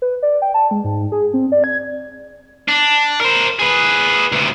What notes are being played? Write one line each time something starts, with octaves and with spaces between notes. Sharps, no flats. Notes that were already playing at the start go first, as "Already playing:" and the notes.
B4
D5
G5
A5
G#3
G#2
G#4
C4
D5
G#6
D4
A#4 C5
G#4 B4
D2 C3